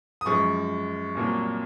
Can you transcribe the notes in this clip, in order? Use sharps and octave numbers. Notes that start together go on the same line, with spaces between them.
D#6
F#2 F3 G#3 C#6
C2 A#2 F#3 A#3